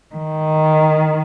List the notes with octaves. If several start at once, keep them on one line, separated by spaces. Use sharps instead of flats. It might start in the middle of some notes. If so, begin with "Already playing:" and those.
D#3